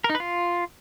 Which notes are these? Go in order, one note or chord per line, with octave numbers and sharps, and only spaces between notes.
A#4
D#4
B4
F4